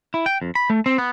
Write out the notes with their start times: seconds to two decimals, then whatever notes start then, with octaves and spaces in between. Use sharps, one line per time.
0.14 E4
0.26 G5
0.42 F2
0.55 B5
0.70 A3
0.86 C4
0.98 B3